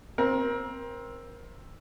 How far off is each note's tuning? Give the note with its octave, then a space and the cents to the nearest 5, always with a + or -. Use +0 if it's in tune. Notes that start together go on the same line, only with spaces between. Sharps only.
C4 +10 A#4 +25